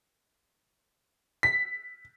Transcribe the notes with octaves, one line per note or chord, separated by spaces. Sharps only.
B6